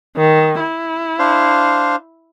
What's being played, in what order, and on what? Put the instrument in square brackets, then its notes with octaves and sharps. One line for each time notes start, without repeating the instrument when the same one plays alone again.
[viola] D#3
E4
[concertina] D4 C5 F5